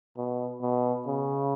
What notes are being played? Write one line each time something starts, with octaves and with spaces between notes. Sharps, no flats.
B2
B2
C#3